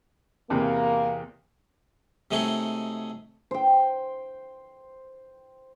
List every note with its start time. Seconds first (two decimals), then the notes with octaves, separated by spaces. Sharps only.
0.50 E2 C3 A#3
2.31 C3 F#3 G#3 A3 D#4 G#4
3.51 C5 G5